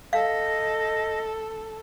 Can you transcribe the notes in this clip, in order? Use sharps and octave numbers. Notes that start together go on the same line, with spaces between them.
A4 D#5 F5